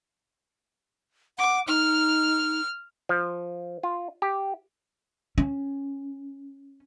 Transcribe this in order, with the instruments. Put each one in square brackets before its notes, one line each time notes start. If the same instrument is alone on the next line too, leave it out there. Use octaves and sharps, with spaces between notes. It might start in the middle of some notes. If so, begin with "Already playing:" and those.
[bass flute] F#5 [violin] D6
[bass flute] D#4 [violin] F6
[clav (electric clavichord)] F3
F4
G4
[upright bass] C#4